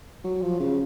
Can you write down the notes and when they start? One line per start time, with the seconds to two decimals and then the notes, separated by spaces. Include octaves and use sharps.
0.24 F#3
0.42 F3
0.60 C#3